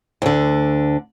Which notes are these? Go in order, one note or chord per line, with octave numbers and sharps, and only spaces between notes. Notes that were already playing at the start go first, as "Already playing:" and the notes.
D2 D3